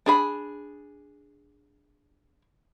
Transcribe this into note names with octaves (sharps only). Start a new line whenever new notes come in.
D4 G#4 B5